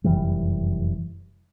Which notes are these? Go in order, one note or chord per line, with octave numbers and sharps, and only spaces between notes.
F1 F#2 E3 G3